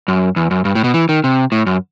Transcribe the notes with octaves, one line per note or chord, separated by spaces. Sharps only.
F#2
E2
F#2
G2
A2
B2
E3
D#3
C3
A2
F#2